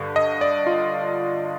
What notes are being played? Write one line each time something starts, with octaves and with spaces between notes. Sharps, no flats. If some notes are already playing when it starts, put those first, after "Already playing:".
Already playing: G2 D3
D#5
D5
F4